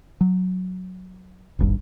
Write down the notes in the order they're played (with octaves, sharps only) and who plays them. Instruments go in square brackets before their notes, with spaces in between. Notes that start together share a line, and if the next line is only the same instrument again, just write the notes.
[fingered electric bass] F#3
D#1 G#1 G2